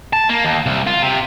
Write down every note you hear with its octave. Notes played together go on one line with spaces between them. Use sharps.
A5
A#3
D#2
C2
F4
C3